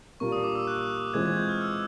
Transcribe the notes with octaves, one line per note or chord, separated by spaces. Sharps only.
A#2 G3 A#3 D4 F4 C#6
D#6
D6
E6
F#6
E3 G#3 C4 F4 G#6
G#6
G6
F6
E6